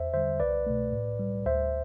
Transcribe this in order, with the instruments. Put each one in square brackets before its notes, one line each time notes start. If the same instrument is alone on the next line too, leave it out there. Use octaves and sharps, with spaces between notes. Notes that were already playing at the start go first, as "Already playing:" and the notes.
Already playing: [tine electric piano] E2 C5 E5
D3 G3 C5 E5
C2 B4 D5
B2 A3
A2
G3
D2 C5 E5